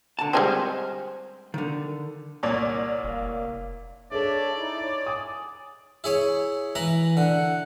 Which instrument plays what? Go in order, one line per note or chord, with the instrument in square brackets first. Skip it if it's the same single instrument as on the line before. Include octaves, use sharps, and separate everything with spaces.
[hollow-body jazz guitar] D3 A5
[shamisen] G3 G#3 C4 [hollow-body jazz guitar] C5 G#5
[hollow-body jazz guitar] D3 D#3
[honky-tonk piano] C2 C#5 D5 [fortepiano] A#2
[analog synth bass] F1 [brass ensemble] A#3 F5
[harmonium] D4 C#5 E5 [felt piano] G#4 A4 [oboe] D5
[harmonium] D#4 E4
C#5
[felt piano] G#5 D#6
[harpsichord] E4 G#4 C#5
E3 B4 A#5
[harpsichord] D3 [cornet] F#5